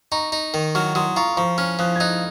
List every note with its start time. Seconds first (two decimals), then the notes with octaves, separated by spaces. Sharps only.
0.12 D#4 A#5 C#6
0.32 D#4
0.54 D#3
0.75 F#3 C#6 F6
0.95 F#3 C6 D#6
1.16 F4 A#5 C#6
1.37 F3 A#5 C#6
1.58 C#4 C#6 F6
1.79 F3 D#6 F#6
1.96 G#6
2.00 D#4 D#6 F#6